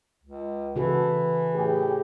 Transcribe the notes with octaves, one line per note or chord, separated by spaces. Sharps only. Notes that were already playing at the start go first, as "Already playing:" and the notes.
C#2
C#3 E3 F#4 A4
A2 G4 G#4